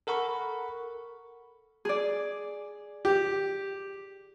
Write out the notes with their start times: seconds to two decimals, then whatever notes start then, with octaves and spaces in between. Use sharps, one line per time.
0.07 A4 A#4 F#5 B5 C#6
1.85 G#4 D5
3.05 G4